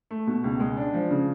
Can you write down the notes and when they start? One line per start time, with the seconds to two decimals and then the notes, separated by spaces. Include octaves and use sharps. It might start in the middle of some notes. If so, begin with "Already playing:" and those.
0.11 A3
0.27 B2
0.44 C#2
0.60 G#3
0.77 D4
0.94 F3
1.11 C#3